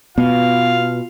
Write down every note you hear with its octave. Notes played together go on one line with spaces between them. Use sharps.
B2 B3 F4 F5